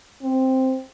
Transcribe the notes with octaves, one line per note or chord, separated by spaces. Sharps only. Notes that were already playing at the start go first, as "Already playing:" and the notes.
C4